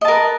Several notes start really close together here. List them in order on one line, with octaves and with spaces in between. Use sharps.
D#5 A5 A#4 B4